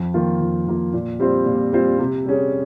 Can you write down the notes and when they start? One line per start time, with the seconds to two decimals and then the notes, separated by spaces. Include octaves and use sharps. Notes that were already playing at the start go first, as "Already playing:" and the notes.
Already playing: F2
0.14 D#3 A#3 F4
0.41 F2
0.67 D#3 A#3 F4
0.93 A#2
1.20 G3 C4 F4 C5
1.46 A#2
1.73 G3 C4 F4 C5
1.99 C3
2.26 G3 C#4 G#4